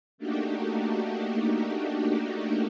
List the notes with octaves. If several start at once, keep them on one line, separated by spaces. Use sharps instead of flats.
A3 A#3 D4 D#4 F#4 G4